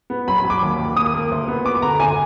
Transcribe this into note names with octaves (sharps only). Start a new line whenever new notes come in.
B3
F#3 B5
B5
F#3
D6
D#2
D#2
A#3 D#6
A#3
D2
B3
B3 D6
D3 A#5
D2 G#5